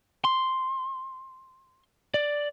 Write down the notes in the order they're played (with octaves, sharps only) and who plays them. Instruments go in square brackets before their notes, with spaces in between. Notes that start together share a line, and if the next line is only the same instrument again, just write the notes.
[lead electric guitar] C6
D5